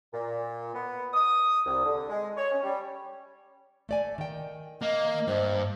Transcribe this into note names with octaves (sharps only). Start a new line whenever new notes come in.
A#2
B3
D#6
C2
D3
G#3
C#5
C#4
G3
A3 D5 G#5
D#3 G5
A#3 D#5
G2 C5